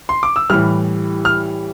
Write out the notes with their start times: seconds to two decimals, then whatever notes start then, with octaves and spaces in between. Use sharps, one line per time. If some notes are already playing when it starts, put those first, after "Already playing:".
0.09 C6
0.23 D6
0.36 E6
0.50 A2 E3 G3 F6
1.25 F6